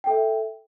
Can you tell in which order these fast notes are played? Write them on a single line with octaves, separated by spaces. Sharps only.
G5 A4 E5